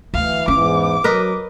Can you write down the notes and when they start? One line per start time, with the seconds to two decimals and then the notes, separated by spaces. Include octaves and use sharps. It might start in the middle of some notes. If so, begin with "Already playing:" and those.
0.14 D2 E3 F5
0.48 E2 G#2 E3 C#4 D6
1.04 F#3 A#4 B4 D#5